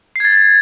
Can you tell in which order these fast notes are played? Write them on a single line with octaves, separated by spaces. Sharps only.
C7 G#6 A6